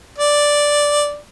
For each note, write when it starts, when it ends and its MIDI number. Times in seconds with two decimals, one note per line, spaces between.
0.18 1.17 74